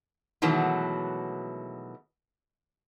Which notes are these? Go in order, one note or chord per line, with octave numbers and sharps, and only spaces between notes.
B2 D#3 E3 F#3 G#3 A3